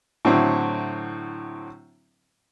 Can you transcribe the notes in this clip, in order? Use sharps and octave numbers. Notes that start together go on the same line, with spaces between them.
A2 D3 F#3 C4 E4